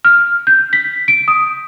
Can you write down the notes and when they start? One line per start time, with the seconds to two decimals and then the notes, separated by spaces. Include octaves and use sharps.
0.05 F6
0.47 G6
0.73 B6
1.08 D7
1.28 D#6